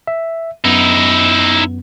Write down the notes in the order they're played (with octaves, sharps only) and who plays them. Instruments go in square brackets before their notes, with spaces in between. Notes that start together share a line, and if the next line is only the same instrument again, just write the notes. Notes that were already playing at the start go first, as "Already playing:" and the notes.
[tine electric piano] E5
[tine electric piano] F#2 B3 [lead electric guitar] D#4 E4